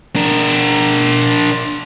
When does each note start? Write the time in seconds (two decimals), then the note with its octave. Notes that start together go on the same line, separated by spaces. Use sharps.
0.16 D4 A#4